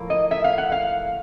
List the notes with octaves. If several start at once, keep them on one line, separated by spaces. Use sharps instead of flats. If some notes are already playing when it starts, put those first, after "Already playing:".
Already playing: A2 F3 A#3
D#5
E5
F5
F#5
F5